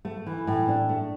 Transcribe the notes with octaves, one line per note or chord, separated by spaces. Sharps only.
A3
E3
A2
D4
A3